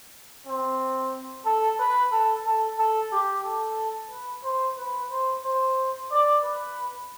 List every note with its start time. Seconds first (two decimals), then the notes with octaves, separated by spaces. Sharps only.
0.47 C4
1.46 A4
1.79 B4
2.12 A4
2.45 A4
2.78 A4
3.12 G4
3.45 A4
4.11 B4
4.44 C5
4.78 B4
5.11 C5
5.45 C5
6.11 D5
6.44 B4